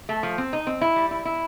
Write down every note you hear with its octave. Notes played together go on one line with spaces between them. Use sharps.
A3
F3
C4
D#4
C4
E4
G3
E4
E4